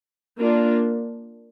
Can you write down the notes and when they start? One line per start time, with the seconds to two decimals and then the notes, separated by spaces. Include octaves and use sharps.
0.38 A#3 D4 F4